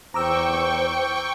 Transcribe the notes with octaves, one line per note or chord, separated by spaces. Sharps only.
E2 C5 G5 A#5 C#6 D6 E6